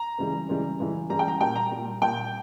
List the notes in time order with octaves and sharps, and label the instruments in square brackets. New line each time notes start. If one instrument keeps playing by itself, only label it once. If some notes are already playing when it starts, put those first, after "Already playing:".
Already playing: [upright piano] A#5
C#2 C#3 E3 G3
C#2 C#3 E3 G3
C#2 C#3 E3 G3
C#2 C#3 E3 G3 A#5
G5
A#5
A#2 G3 G5
A#5
A#2 G3
A#2 G3 G5